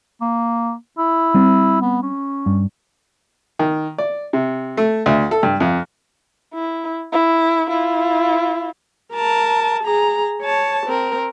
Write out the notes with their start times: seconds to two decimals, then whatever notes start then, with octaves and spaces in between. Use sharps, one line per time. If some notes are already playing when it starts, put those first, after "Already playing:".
0.21 A#3
0.98 E4
1.34 G3 C4
1.81 B3
2.02 C#4
2.46 G2
3.59 D#3
3.98 D5
4.33 C3
4.77 A3
5.06 D2
5.31 A4
5.43 G2
5.60 F2
6.54 E4
7.13 E4
7.69 E4 F4
9.13 A#4 A5
9.84 G#4 A#5
10.42 C#5 A5
10.86 C4 A#4